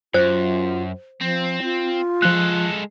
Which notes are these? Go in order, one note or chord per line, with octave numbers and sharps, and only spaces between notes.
F#2 F4 C5
F3 C4
F4
F3 G#3 A4 F#6